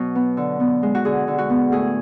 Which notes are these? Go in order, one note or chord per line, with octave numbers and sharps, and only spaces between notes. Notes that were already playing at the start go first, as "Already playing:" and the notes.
Already playing: B2 F#3 C#5
B3
D3
B3
G#3
F#4
D3 G#4
D3
F#4
B3
A2 G#4